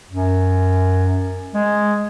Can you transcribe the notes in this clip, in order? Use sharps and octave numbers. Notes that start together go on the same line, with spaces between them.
F#2
G#3